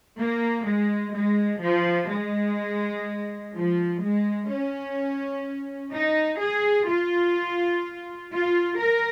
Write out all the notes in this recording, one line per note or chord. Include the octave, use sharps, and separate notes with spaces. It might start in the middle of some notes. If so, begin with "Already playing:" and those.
A#3
G#3
G#3
F3
G#3
F3
G#3
C#4
D#4
G#4
F4
F4
A#4